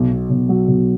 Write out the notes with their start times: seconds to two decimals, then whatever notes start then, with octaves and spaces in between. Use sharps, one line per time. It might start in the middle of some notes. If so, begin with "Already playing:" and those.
Already playing: B1
0.11 B2
0.30 B1
0.49 F#3
0.68 B1